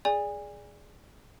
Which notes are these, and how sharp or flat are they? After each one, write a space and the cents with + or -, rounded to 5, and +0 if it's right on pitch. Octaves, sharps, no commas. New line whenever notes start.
G#4 +0 D5 +0 G#5 -30